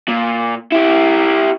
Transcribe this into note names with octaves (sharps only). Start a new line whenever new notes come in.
A#2
E4 G4